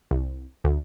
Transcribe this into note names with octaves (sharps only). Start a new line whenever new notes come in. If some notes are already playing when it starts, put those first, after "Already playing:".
C2
D2